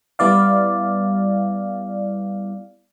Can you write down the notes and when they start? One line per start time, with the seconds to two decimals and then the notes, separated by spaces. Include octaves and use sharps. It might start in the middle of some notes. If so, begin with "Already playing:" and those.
0.19 G3 B3 E4 D5 F5